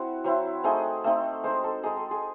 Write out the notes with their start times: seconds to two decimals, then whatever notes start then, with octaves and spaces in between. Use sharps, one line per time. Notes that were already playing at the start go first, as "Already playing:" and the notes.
Already playing: C4 E4 F#4
0.24 F#3 C4 E4
0.64 A3 C4 D#4 G#4
1.04 A3 C4 D#4
1.44 G#3 D#4 C5
1.64 A4
1.83 G#3 D#4 G#4
1.97 A4
2.11 G#4